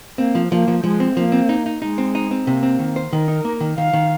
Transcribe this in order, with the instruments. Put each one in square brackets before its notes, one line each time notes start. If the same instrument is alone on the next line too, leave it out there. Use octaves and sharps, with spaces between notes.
[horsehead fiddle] A#3 [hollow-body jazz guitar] C4
[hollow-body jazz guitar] F3
[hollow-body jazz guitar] F3 [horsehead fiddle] A#3
[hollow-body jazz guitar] F3
[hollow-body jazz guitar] F3 [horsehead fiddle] G#3
[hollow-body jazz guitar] C4
[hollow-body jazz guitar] F3 [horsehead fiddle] A#3
[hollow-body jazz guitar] C4
D#4
D#4
[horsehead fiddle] G#3 [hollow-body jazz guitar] D#4
[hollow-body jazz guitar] C4
D#4
C4
[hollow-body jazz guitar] C3 [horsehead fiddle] A#3
[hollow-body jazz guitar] C4
D#3
C5
[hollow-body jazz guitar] D#3 [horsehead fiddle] A#4
[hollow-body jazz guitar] D#4
A#3
D#3
[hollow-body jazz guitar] D#3 [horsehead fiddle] F5
[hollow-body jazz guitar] D#3